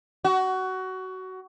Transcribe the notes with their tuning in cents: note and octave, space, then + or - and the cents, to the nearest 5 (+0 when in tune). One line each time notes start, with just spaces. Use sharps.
F#4 +20